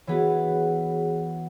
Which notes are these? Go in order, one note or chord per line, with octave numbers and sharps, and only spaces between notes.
E3 B3 F#4 G#4 C#5